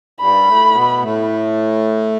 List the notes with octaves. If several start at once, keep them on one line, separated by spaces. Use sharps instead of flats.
G2 G3 B5
A2 A3
B2 B3
A2 A3